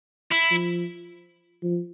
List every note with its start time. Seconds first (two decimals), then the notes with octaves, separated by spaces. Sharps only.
0.31 E4
0.51 F3
1.63 F3